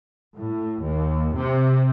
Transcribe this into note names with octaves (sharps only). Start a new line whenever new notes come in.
A2
D#2
C3